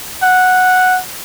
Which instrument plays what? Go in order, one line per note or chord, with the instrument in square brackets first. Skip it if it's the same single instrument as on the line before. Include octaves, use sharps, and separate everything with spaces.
[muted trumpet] F#5